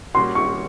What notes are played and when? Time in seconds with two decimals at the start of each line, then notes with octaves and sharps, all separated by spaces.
0.14 A#2 G3 A#3 C#4 F#4 C6
0.35 C#6